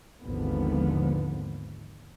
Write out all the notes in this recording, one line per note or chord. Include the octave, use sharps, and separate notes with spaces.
G#1 D#2 D3 F3 B3